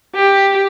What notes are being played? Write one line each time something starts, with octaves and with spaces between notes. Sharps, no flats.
G4